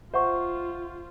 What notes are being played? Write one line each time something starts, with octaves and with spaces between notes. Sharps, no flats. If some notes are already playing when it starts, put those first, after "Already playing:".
F4 C5 E5 F#5 C#6